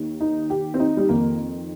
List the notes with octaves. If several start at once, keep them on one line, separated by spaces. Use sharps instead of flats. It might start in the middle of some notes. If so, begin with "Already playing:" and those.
Already playing: D#2 D#3
D#4
G4
C4
D#4
G3
F2 D#3 A#3